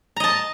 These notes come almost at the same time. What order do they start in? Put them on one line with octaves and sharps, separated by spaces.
A#5 D#5 A5